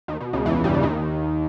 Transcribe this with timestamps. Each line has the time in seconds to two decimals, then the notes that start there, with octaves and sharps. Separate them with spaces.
0.08 D#2 D#3
0.20 B2
0.33 C#2 C#3
0.45 E2 E3
0.64 G2 G3
0.74 C#3
0.83 D#2 D#3